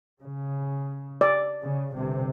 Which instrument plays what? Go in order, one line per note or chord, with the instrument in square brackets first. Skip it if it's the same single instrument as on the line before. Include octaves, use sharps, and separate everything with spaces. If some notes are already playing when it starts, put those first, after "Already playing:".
[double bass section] C#3
[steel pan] D5
[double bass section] C#3
G1 C3